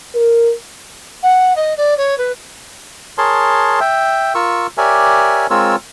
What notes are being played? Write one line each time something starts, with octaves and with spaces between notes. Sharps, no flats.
A#4
F#5
D#5
D5
C#5
B4
G#4 A#4 C#5 A5 C6
E5 G5
F4 A#4 C#6 E6
G4 A#4 C#5 D5 E5 G#5
G#3 C4 F4 A#4 C#5 E6